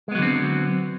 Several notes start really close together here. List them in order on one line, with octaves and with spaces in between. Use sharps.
G#3 B3 F#3 D3 C4